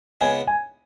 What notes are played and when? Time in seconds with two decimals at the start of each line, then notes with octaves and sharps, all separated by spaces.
0.21 C#2 C#3 G#3 B3 G#5
0.47 G#5